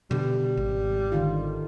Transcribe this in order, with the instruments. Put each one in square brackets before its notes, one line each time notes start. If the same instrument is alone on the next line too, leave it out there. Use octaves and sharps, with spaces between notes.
[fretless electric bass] B2 D3 [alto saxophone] G3
[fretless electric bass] G#1
[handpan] D3 D#3 F4